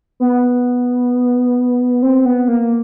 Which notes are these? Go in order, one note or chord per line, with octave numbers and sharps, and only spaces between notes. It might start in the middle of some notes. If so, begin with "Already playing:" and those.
B3
C4
B3
A#3